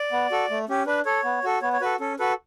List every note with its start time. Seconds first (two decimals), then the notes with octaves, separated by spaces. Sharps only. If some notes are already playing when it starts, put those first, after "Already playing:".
Already playing: D5
0.12 B3
0.31 F#4 A4
0.50 A3
0.69 C#4 G4
0.87 D4 B4
1.05 A4 C#5
1.24 B3
1.44 F#4 A4
1.62 B3 C#5
1.73 C#5
1.81 F#4 A4 B4
2.00 C#4 A4
2.19 F#4 A4 B4